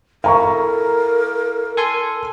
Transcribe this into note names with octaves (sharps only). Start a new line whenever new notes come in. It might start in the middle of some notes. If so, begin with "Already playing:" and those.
E4 A4 A#4 F5 A#5 C#6
A4 G#5 C6